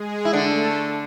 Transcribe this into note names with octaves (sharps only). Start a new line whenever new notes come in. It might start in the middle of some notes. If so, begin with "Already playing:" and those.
Already playing: G#3 G#4
E4
D3 A3 D4 A4